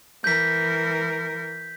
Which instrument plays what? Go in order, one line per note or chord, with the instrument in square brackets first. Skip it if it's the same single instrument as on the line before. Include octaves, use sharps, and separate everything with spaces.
[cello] E3 A#4 [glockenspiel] G6 B6